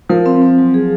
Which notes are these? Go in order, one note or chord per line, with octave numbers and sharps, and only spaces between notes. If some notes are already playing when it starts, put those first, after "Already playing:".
F3 A#4
C4
C4
F#3
G#4